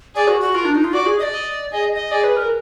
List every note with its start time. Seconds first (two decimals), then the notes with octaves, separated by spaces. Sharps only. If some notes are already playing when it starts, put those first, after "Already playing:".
0.15 G#4 D5
0.28 F#4
0.41 F#4
0.55 F4 A#4
0.65 D4
0.75 D#4
0.84 F4
0.93 F#4 D5
1.06 G#4
1.19 D#5
1.23 D5
1.33 D#5
1.72 G#4 D#5
1.96 D#5
2.11 G#4 D5
2.24 B4
2.37 A#4